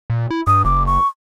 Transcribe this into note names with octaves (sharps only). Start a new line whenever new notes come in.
A#2
E4
G2 D#6
F#1 D6
C#6